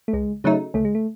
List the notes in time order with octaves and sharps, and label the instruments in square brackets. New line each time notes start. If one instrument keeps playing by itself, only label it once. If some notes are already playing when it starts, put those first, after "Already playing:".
[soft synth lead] A3
[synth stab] C#2 [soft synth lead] G#3
[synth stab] C#3 F#3 A3 D#4
[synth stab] C#2 [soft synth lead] A3
[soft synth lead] G#3
A3